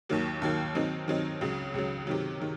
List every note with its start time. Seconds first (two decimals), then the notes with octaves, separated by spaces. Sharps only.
0.09 D#2 D#3 F#3 A#3
0.42 D#2 D#3 F#3 A#3
0.75 D#3 F#3 C4 D#4
1.08 D#3 F#3 C4 D#4
1.41 C#2 C#3 F#3
1.74 C#2 C#3 F#3
2.07 C3 D#3 F#3
2.40 C3 D#3